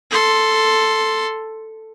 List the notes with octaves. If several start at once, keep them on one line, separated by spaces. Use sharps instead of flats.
A4 C6